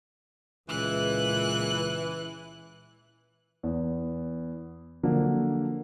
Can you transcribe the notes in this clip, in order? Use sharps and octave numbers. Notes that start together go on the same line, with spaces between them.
C#2 A#2 E3 F#6
E2
D3 F3 F#3 A#3